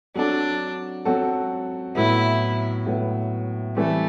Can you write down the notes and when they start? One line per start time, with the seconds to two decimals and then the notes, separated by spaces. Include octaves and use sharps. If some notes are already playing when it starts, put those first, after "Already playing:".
0.15 F#3 C4 D4 F#4 A4
1.05 F#3 C4 F#4 A4
1.95 A2 F#3 B3 E4
2.86 A2 F#3 B3
3.76 E3 G3 A3 C4